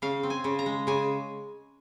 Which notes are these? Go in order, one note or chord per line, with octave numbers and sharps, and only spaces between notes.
C#3 F5
C4
G#5
C#3
A#5
G#3
C#3 G#5